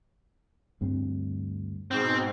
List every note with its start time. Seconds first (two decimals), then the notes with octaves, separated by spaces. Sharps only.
0.81 D2 G2 C4
1.91 G#2 B2 C4